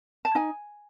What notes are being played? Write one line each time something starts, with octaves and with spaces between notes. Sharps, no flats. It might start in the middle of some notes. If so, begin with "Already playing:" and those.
A5
D#4 G#5